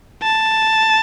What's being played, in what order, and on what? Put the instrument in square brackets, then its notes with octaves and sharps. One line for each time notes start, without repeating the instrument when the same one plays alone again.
[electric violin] A5